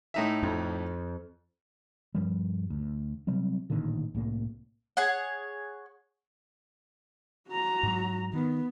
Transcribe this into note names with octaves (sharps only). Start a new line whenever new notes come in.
A2 D#4 E5
F2
G2 F3 G3
D2
C3 F#3 G3 C4
A1 A#2 D3 D#3
C2 A2 A#3
G#4 C#5 F#5
F#4 A#5
G#2 F#3
D#3 B3